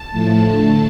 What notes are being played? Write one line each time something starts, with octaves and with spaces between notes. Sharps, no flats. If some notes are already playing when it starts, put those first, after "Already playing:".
Already playing: A5
A2 F3 A3
D3 A3